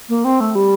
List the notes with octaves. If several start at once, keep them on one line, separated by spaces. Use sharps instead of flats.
A#3
C4
A3
G3